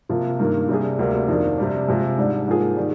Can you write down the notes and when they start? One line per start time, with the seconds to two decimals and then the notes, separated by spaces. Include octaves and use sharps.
0.09 C3 F3 A#3 F4
0.39 G2 D#3 A#3
0.69 C3 G3 D4 G#4
0.99 D2 C3 G3 A#3
1.28 F2 D#3 A#3 D4
1.58 C3 G3 D4
1.88 C3 F3 G#3
2.18 G#2 G3 D4
2.48 G#2 F3 A#3 F4 G#4
2.77 D#3 G3